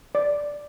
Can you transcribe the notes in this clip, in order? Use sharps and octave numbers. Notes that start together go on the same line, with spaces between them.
D5